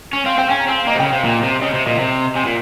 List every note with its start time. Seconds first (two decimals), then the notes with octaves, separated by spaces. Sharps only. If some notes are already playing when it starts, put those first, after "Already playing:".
0.13 C#4
0.26 C4 F5
0.38 C4 G5
0.50 C#4 G#5
0.60 A#5
0.69 C4 G#5
0.78 F5
0.87 A#3 D#5
0.95 C3
0.99 C#3 G5
1.12 C3 F5
1.24 A#2
1.43 C3
1.62 C#3 D#5
1.74 C3
1.86 A#2 D#5
1.98 C3
2.35 C3 G#5
2.45 A#2